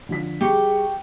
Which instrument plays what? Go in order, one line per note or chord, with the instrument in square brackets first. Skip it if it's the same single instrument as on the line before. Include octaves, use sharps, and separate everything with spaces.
[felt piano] D3 F3 B6
[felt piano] G3 C#6 C#7 [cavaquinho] G4 [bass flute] G#4